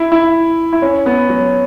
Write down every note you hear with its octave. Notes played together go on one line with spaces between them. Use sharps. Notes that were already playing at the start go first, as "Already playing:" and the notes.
Already playing: E4
E4
E4
C#4
B3
F#3